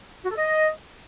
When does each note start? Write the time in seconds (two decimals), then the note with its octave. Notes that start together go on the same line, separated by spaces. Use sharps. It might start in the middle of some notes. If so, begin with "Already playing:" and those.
0.24 F#4
0.31 A4
0.38 D#5